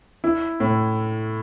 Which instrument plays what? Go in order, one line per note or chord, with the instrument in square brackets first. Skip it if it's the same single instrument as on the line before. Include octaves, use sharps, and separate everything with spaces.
[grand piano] E4
A2